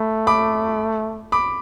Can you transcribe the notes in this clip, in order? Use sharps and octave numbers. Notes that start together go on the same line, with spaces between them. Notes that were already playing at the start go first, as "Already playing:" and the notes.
Already playing: A3 B5
B5 D6
B5 D6